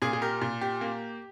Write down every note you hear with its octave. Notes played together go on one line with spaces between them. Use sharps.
A#2 G#4
G#4
G4 A#4
A#2
G4
A#3